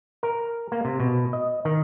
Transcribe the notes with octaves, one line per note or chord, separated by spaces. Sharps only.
A#4
A#3
C3
B2
D#5
D#3